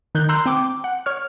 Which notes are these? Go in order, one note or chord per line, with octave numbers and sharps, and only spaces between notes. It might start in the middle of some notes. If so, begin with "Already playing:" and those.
D#3 F#6 G6
A#5 C6 E6 F#6 G6
C4 G5 D6
F#5
C#5 F6